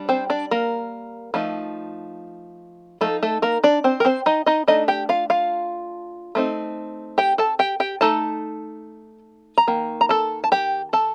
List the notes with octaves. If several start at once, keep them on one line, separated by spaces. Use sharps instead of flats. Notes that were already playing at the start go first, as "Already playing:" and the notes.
Already playing: G3 D4
C4 C5
D4 D5
A#3 A#4
F3 A3 D#4
F3 A3 D#4 A4
A3 A4
A#3 A#4
D4 D5
C4 C5
A#4
C4 C5
D#4 D#5
D#4 D#5
A3 D4 D#4 D#5
G4 G5
F4 F5
F4 F5
A3 C4 D#4
G4 G5
A4 A5
G4 G5
G4 G5
A3 D#4 A4 A5
A#5
D#3 A#3
A#5
A4 A5
A5
G4 G5
A4 A5